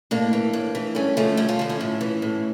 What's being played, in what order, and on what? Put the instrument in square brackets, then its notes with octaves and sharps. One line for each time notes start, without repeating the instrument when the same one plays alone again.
[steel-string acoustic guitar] A2 A#3 D4
E3
A2
E3
G2 A3 C#4
D3 F3 A3 C#4
G2 C#4 E4
F4 A4
D3 F3
C#4 E4
A2
E3
A2